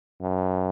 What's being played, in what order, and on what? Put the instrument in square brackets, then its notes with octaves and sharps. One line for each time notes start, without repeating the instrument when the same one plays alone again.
[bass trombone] F#2